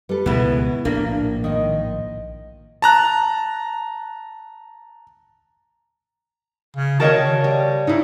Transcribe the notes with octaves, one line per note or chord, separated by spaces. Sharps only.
G3 A4 B4
C#2 G#2 B2 E3 B3 E4
A#1 A2 A#3 D4
G#2 D#3 D#5
A5 A#5 F#6
C#3
D#3 F#4 A#4 C#5 D#5 A5
C#3
G3
G#2 D#4 E4